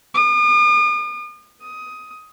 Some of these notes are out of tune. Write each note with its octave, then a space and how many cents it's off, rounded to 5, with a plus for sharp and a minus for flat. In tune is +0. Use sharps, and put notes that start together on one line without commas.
D#6 -45
D#6 +15